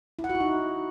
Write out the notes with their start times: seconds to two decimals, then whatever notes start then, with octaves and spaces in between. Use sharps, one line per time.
0.19 E4
0.24 F#5
0.29 F#4
0.35 E4
0.40 D#4